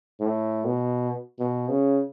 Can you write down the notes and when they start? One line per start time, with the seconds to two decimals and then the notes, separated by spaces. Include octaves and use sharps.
0.20 A2
0.65 B2
1.39 B2
1.69 C#3